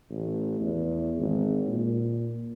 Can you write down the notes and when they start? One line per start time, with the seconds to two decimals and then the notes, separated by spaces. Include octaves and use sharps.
0.10 A1
0.60 E2
1.17 G#1
1.68 A#2